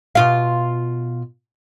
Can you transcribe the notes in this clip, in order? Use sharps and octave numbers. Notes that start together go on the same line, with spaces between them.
B2 F4 F5